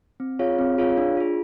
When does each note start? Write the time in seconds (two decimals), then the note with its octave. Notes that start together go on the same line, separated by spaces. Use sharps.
0.20 C4
0.39 F4 G#4 C#5 F5
0.59 C4
0.78 F4 G#4 C#5 F5
0.98 D4
1.17 F4 G#4